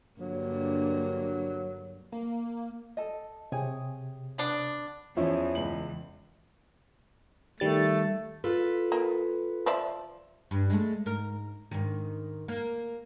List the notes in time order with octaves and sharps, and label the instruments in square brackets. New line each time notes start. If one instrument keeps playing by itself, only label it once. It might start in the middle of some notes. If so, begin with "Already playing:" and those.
[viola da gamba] G2 D3 A#3 [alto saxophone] F#3
[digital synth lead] A#3
[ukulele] A4 D#5
[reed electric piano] C3 [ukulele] G#4 C#5 G5
[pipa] B3 D4
[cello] E2 [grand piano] F3 C#4 E4
[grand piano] C#2 F#7
[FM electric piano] D#3 G3 A6 [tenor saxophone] A3
[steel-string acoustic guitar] F4 A4 B4
[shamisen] A#3
F3 D5 E5
[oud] G2
G#3 A3
G#2 A#4
G#2 D#3
A#3